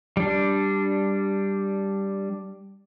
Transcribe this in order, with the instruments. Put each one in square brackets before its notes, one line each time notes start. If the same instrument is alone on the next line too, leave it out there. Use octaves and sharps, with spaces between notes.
[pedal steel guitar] G3 D4